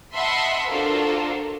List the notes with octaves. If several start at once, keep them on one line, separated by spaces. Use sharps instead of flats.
D#5 E5 F#5 A5 B5 C6
D4 F4 F#4 A4 A#4 C5